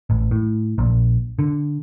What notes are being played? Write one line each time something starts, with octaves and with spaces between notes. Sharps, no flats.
A1
A2
A#1
D3